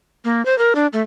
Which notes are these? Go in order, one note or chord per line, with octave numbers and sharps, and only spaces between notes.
A#3
C5
A#4
D4
A3